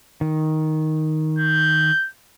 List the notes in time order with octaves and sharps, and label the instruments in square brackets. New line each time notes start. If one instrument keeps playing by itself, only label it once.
[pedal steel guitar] D#3
[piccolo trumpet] G6